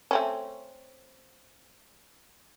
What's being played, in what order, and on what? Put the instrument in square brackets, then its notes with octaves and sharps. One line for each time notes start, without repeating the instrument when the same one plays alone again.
[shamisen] A3 C4 C#4